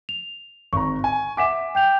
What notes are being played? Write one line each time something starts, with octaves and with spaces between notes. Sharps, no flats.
F7
G#1 A#5 C#6
G#5
E5 F#5 G#5 D6 B6 E7
G5 G6 F7